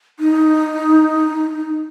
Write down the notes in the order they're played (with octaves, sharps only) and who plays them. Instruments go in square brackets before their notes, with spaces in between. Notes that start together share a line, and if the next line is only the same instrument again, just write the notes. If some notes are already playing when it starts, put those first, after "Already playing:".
[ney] D#4